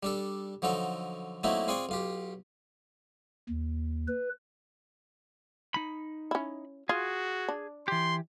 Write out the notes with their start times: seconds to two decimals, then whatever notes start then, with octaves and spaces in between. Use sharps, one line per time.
0.03 G3 D4 A4
0.62 D3 F3 F#3 D#4 A4
1.43 F#3 A3 A#3 C4 D#4 E4
1.68 C4 F4 G#4 D5 G5 C#6
1.89 B1 F4 G4
3.49 D#2
4.08 B4
5.74 D#4 B5
6.31 C#4 E4
6.89 F4 F#4 G#4
7.48 D4
7.88 E3 G4 C6